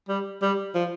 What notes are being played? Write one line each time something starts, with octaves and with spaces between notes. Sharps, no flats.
G3
G3
F3